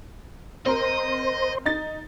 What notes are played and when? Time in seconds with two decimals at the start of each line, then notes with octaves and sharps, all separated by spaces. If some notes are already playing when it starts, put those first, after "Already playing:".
0.66 C4 A#4 C5 D#5 C6
1.66 D#4 A6